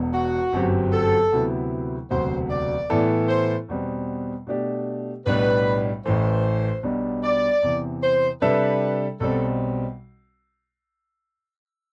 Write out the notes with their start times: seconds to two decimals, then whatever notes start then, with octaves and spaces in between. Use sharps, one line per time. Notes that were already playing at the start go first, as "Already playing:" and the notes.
Already playing: E1 E2 B2
0.13 F#4
0.53 G1 F#2 F#3 C4 G4
0.93 A4
1.32 D2 C3 F#3 B3 E4
2.11 E1 D2 C3 F#3 C5
2.50 D5
2.90 A2 E3 B3 E4 A4
3.29 C5
3.68 E2 B2 G3 C4
4.47 B2 A3 D4 G4 D5
5.26 B1 A2 G3 B3 D4 B4
6.05 A1 A2 E3 A3 C5
6.83 B1 B2 G3 D4
7.23 D5
7.62 E2 C3 E3
8.03 C5
8.42 C3 G3 D4 A4 B4 E5
9.20 B1 B2 G3 C4 A4